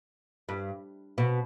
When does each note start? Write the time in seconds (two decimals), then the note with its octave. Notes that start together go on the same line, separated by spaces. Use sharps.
0.49 G2
1.18 B2